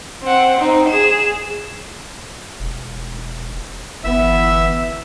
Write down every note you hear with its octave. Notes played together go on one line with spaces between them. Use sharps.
C4 F#5
C4 D#4
G#4 E7
E1
G1 E3 B3 E5 E6